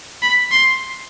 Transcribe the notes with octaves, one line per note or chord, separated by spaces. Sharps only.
B5
C6